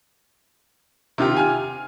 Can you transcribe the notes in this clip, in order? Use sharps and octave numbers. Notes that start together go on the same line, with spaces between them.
C3 D#3 F4 G4
G#5 F6